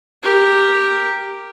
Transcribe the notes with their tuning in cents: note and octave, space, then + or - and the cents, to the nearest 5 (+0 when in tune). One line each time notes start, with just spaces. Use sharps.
G4 +0 A#4 -5